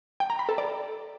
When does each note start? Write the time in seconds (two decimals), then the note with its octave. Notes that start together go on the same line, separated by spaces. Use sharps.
0.20 G5
0.30 A#5
0.39 B5
0.49 A4
0.58 D5